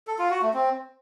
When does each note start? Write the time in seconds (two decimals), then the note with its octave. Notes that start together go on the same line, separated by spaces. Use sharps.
0.07 A4
0.19 F4
0.30 F#4
0.42 A3
0.54 C4